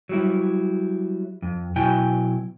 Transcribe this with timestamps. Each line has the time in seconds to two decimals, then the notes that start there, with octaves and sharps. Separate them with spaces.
0.09 F#3 G3 E4
1.42 F2
1.76 B2 F#3 E4 G5 G#5